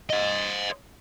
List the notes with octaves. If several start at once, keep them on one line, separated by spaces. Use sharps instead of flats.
C5 D#5